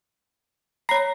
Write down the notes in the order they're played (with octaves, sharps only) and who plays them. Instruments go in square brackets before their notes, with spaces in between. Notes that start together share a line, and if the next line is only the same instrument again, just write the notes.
[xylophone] C#5 C7 [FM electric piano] A#5 B5 A#6